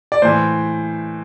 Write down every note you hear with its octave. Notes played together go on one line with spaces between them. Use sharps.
D5
A2 E3 C5